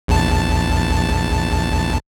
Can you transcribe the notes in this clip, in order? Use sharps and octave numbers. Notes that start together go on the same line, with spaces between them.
A#1 E2 A5